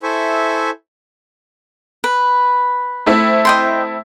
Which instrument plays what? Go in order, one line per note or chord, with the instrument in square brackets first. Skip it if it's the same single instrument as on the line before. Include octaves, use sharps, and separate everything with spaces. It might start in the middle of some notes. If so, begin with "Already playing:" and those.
[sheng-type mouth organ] E4 A4 C5 E5 G#5 C#6
[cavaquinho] B4
[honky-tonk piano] A3 C4 E4
[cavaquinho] D#5 G5 C6